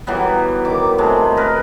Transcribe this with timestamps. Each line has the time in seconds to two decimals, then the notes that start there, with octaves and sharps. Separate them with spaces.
0.07 E3 F#3 G3 B3
0.65 D#3 D6
0.98 C3 G#3 A3
1.37 A#4 B4